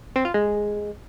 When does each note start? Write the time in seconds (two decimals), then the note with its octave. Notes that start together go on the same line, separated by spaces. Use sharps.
0.16 C4
0.25 F4
0.34 G#3